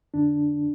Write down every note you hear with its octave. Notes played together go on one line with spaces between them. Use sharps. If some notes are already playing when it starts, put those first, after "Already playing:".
F2 D3 D4